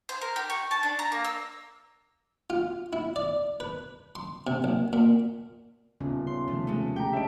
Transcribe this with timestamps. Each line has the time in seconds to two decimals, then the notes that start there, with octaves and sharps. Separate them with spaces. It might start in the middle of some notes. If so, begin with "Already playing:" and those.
0.09 C5
0.21 A#4
0.36 G4
0.50 C#6
0.71 A5
0.83 D4
0.99 A#5
1.12 A#3
1.24 E6
2.50 F4
2.93 E4
3.16 D5
3.60 B4
4.15 C6
4.47 C3
4.64 A#1
4.93 A#2
6.00 D#1 C#3 B3 C#4
6.27 C6
6.48 C3 D#3 F3 A3
6.67 G#3 A3 C#4
6.96 G4 G5 A#5
7.13 D4 C#5 D#5 E5 A5 D7